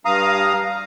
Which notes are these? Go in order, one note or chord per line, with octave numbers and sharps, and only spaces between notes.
G2 F5 A#5 D#6